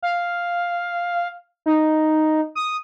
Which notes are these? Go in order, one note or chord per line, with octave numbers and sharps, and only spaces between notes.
F5
D#4
D#6